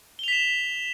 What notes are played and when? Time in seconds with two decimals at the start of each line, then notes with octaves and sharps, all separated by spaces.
0.19 G7
0.24 F7
0.28 B6
0.33 E7